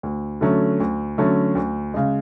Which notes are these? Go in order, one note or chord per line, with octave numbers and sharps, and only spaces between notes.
D2
D3 F#3 A3 C#4
D2
D3 F#3 A3 C#4
D2
C#3 G#3